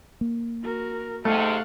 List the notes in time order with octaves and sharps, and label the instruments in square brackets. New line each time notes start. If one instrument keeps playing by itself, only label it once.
[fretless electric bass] A#3
[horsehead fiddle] F#4 A#4
[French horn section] G#2 C3 [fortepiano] A3 [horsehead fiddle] F5 F#5